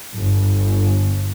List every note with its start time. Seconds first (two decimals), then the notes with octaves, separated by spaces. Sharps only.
0.14 G1